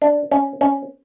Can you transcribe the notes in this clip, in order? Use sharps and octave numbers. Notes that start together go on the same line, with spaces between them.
D4
C#4
C#4